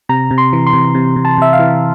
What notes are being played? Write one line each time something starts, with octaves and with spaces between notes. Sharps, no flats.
C3 A#5
C3
C6
E3
C6
C3
C3
C3
A5
C3 E5
F5
E3